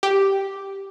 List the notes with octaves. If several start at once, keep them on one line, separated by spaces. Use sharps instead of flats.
G4